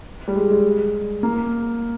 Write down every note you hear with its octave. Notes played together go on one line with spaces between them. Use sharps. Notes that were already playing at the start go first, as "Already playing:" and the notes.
G3
G#3
G#3
A#3